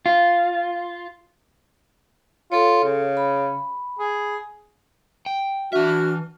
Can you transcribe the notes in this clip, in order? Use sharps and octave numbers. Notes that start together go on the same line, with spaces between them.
F4
F4 A4 C#5
C#3
B5
G#4
G5
E3 D4 F#4 E5 F6